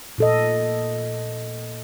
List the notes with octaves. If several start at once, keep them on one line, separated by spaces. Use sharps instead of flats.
A#2 A4 D#5